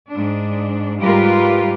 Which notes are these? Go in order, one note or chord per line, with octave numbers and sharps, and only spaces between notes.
G#2 D4
G#2 G3 F4 G4 A#4 B4